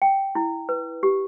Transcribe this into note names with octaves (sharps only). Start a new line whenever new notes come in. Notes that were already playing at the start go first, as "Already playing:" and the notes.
G5
E4
B4
G4